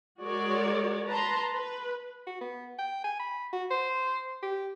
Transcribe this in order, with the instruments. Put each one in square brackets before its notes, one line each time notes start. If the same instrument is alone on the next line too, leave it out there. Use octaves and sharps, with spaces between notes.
[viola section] G#3 F#4 A#4 C#5 D5
B4 A5 A#5 C6
B4
[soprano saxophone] F#4
B3
G5
G#5
B5
F#4
C5
G4